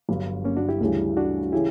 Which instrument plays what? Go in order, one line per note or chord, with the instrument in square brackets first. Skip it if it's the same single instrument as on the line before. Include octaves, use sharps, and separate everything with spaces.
[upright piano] G1 G2 F#3
[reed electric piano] A#3 C#4
D4 F#4
E4 G4
[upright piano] D2 C#3 E3 G3
[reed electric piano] D4 F#4
[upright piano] C#3 E3 [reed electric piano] E4 G4